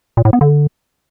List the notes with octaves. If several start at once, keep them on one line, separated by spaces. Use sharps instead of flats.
A#2
A2
B3
D3